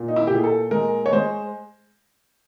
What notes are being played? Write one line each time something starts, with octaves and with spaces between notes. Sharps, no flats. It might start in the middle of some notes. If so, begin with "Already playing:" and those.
Already playing: A#2
D#4
E4
A#2 G4
G#4
A4
G#3 A#4
C#5
G#3 C5